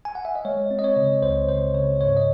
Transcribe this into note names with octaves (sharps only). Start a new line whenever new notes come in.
G#5
F#5
E5
D#5
G#3 C#5
C4
D#5
C#5
C#3
C#2 C5
C#3 C5
C#3 C#5
G#2 C#5
D#5